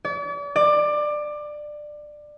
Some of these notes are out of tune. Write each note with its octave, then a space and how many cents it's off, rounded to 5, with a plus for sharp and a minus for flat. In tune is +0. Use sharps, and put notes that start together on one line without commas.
D5 -40
D5 +20